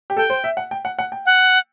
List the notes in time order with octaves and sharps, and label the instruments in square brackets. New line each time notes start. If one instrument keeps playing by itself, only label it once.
[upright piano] G4
[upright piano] A4 [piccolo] G5
[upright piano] C5
E5
F#5
G5
F#5
F#5
G5
[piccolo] F#5